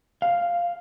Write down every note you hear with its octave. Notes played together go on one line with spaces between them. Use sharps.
F5